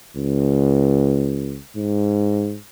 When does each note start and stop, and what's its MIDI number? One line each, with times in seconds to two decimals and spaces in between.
0.16 1.59 37
1.76 2.57 44